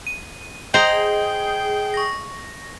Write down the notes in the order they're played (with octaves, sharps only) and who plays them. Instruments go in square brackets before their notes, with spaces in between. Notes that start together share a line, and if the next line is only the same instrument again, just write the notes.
[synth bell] D#7
[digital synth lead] G#4 [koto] C5 A#5 [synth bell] D#5 G6 [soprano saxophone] G5
[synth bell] C#6 A#6